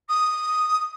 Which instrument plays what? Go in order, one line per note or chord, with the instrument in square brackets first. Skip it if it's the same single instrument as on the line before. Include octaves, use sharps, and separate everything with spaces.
[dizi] D#6